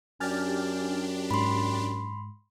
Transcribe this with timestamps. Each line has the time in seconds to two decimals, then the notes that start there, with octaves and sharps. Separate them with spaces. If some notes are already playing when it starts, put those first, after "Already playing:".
0.20 F#2 D4 G4 G#5 F6 A6
1.31 G#2 B5 C6